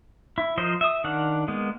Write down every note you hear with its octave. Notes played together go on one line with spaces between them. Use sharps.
E4
F3 A#4 C5 D#5
E5 D#6
D#3 D4 F5 F#5
G#3 A#3 B3